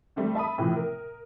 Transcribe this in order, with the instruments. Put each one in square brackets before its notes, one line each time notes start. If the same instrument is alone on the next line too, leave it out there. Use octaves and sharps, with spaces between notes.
[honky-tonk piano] G3 A3 C4 D4
E5 A5 B5 D#6
A2 C3 E3 F3
A#4